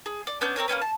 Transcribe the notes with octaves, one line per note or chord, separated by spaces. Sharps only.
G#4
D5
B3 C#4 D4 G6
C4 D4 A#4 C#5
A#3 C4 C#4 B4
A5